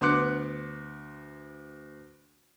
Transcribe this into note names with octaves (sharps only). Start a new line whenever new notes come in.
D2 B3 C6 D6 F#6 C#7